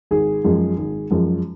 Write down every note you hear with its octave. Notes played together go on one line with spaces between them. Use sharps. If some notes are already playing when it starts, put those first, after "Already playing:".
G#1 G#4
F#2 F3 G#3
G#1
F#2 F3 G#3